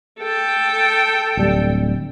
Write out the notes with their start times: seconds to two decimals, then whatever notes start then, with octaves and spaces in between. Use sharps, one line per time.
0.19 A4 G5
1.37 D1 G3